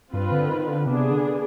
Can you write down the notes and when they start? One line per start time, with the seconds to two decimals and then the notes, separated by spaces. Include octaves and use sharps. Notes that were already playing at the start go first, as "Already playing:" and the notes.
0.13 G2 C4 F4 B4
0.32 D3
0.49 D#3
0.68 D3
0.86 C3 B3 D4 G#4
1.11 D3